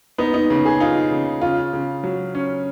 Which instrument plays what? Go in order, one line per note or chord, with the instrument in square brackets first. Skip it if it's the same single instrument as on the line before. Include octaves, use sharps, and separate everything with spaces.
[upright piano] B3 [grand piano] D#4
[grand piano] D#4
[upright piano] C#3
[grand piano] G#4
[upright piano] D#4 [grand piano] F4
[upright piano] C#3
[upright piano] C#3 [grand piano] F4
[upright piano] C#3
F#3
C#4